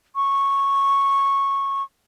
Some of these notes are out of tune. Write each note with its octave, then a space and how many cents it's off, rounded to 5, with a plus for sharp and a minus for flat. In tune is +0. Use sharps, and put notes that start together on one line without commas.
C#6 -10